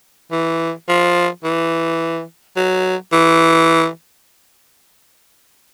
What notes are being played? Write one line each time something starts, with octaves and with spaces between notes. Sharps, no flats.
E3
F3
E3
F#3
E3